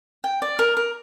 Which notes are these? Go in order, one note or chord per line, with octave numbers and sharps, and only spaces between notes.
G5
D5
A#4
A#4